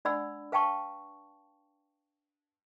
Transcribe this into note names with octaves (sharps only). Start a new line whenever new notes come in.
D4 D5 F#5 B5 E6
B4 F5 G5 A5 C#6